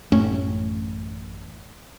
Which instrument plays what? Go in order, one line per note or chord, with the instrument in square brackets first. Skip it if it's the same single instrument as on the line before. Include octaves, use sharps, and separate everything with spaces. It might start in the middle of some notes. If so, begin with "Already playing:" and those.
[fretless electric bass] A1 F#2 A3 C#4